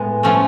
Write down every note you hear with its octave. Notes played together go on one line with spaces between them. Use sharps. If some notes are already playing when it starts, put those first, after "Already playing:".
Already playing: A2 G#3 B3
F3 A3 C#4